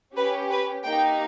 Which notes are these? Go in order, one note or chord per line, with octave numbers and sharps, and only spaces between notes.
C#4 G4 B4
B4
A#3 D#4 G4 G5